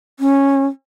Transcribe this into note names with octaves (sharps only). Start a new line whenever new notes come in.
C#4